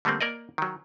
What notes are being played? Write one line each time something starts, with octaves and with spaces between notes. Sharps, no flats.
D3 G3 A3 A#3 C4
A#3 A#4 D5 D#5
D#3 F#3